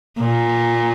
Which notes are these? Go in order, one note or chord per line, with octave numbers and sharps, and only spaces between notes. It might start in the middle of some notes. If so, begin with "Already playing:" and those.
A#2